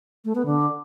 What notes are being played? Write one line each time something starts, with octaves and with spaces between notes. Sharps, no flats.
A3
B3
D3